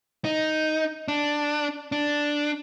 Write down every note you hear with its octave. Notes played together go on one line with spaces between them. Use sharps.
D#4
D4
D4